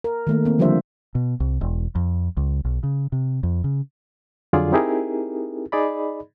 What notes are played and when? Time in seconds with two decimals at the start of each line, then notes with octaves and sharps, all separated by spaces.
0.04 A#4
0.27 D#3 A3 A#3
0.45 A#3 C4
0.59 D3 F3 G3 D4 C5 E5
1.15 B2
1.40 C2
1.61 E1
1.95 F2
2.37 C#2
2.65 B1
2.83 C#3
3.12 C3
3.43 F2
3.64 C#3
4.53 F2 D3 F#3 F4 G#4 D5
4.72 C4 D#4 E4 G4 G#4 A#4
5.72 D#4 G#4 D5 D#5 B5